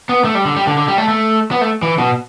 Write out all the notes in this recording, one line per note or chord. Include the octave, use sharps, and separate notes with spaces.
B3
A3
G3
D3
G3
D3
D3
G3
A3
A3
B3
A3
E3
B2